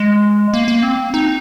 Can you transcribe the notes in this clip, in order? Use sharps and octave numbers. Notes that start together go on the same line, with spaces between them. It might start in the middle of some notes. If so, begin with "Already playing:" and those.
Already playing: G#3
A#3
A#3
C4
D#4